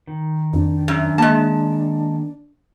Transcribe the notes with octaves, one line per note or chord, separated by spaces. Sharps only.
D#3
F2 D4
F#2
G#3 A#3 A5